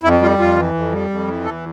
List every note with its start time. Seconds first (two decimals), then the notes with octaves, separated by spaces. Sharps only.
0.03 F2 E4
0.21 G3 F4
0.39 F2 F4
0.56 E3
0.74 F2
0.92 G3
1.10 F2
1.27 E3
1.45 E2 A4